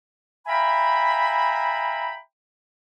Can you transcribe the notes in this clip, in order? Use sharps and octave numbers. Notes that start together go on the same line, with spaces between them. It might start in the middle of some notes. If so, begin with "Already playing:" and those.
E5 F5 G5 G#5 A#5 B5